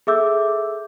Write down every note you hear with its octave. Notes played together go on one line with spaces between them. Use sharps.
G#4 A4 E5 D6 E6 G6